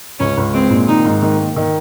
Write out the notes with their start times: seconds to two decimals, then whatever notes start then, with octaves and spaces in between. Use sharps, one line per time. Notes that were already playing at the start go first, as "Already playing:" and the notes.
0.19 C#2 C#4
0.38 C#2
0.53 G#3 C4
0.71 A#2
0.88 D#3 D#4
1.05 G#2
1.23 D#3
1.38 A#3
1.56 D#3